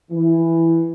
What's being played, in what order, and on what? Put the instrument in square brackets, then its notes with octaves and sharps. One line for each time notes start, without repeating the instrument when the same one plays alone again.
[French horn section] E3